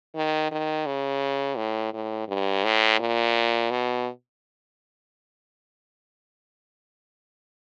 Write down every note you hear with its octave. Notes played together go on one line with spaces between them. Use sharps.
D#3
D#3
C#3
A2
A2
G2
A2
A#2
B2